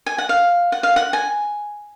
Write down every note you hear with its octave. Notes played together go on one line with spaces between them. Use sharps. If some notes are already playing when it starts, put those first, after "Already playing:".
G#5
F#5
F5
F#5
F5
F#5
G#5